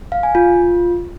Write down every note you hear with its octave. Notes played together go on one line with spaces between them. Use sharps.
F5
G#5
F4